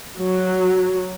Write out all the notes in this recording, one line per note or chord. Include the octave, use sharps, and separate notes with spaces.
F#3